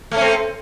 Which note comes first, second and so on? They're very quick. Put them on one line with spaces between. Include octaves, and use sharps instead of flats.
A3 C#4 C4